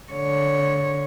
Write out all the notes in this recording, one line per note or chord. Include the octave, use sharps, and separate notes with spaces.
D3 C#5